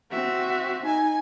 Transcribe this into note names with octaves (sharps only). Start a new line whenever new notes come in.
C4 F#4 E5
D#4 G#5